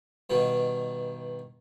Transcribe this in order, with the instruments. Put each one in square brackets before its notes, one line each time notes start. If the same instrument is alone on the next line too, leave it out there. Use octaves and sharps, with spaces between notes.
[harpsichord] G2 B2 D#3